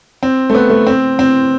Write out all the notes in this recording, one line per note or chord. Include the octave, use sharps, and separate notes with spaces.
C4
A3
B3
A3
C4
C4